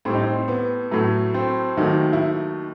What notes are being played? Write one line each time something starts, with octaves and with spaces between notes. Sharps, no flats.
A2 G3 C4
D#4
C4
B3
A2 F#3 A3
C4
D#2 D#3 F#3 A3
E4